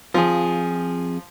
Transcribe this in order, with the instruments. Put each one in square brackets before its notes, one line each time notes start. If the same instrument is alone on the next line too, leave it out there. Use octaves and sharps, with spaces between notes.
[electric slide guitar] F2 G#4 [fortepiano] F3